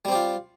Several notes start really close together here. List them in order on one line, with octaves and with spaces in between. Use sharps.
G3 C4 G4 F4